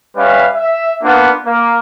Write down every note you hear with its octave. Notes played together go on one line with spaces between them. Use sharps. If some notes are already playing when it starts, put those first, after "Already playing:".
G3 C#4 B4 E5 F5
E5
A#3 B3 D4 F4 F#5
A#3